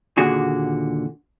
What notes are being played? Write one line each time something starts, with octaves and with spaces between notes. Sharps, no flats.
D#2 A#2 D3 F#4 G#4